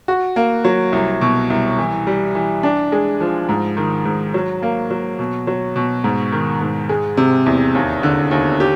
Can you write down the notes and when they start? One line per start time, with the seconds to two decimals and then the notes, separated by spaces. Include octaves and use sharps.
0.08 F#4
0.36 A#3
0.65 F#3
0.93 C2
1.21 B2
1.50 C2
1.79 E3
2.07 G3
2.35 E3
2.63 D4
2.92 G#3
3.20 F3
3.49 G#2
3.77 D#3
4.05 G#2
4.34 F#3
4.62 A#3
4.90 F#3
5.19 B2
5.47 F#3
5.76 B2
6.04 G#2
6.32 D#3
6.61 G#2
6.89 G#3
7.17 C3
7.46 E2
7.75 D#2
8.03 D3
8.31 D#2
8.60 G4